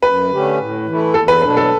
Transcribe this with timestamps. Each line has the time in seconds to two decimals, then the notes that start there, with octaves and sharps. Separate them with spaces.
0.03 F#2 B4
0.30 D3 A3 C#4 G4
0.59 A2
0.86 E3 A3 E4
1.14 E2 A4
1.28 B4
1.42 B2 F#3 A3 D4 B4
1.57 A4